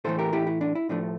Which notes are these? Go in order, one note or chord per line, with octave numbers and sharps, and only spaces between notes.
A2 E3 A3 A4 C5
G4 A#4
E4 G4
E4
D4
E4
A2 F3 A3 D4